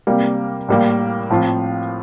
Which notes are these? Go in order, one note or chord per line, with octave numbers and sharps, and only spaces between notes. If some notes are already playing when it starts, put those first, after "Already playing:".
C3 G3 A#3
A2 G3 A#3
A2 F3 C4 F4